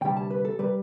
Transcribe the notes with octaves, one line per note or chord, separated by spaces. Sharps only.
D2 C3 G3 G5
A5
B4
A4
C3 G3 B4